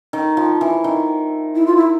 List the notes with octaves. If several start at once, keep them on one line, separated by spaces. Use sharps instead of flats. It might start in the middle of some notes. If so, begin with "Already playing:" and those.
D#3
F3
E3
D#3
E4
F4
E4